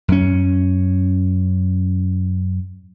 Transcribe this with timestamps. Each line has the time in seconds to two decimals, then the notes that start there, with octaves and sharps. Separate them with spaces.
0.08 F#2 C#4